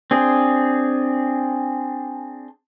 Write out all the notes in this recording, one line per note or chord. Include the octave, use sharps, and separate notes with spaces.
C4 D4 G#4